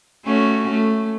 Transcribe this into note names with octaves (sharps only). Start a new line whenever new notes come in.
A3 C#4 F#4
A3